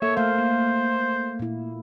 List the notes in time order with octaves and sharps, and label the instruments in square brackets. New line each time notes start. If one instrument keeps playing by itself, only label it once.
[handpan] A#3 A4 [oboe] C#5 [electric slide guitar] E5
[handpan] A3 F5 [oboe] C5
[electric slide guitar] A#3
[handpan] A#2 E4